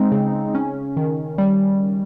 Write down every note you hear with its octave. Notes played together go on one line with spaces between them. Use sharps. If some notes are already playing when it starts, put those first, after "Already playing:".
Already playing: G#3 C4 D#4
C#3
C#4
D#3
G3